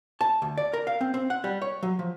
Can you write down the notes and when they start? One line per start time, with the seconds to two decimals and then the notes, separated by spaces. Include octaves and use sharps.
0.21 A5
0.42 D2
0.58 D5
0.73 A#4
0.87 F5
1.01 C4
1.14 C4
1.30 F#5
1.44 G3
1.62 C#5
1.83 F#3
1.99 F3